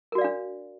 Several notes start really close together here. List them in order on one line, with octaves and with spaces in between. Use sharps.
A#4 F#4 D5 F5 D4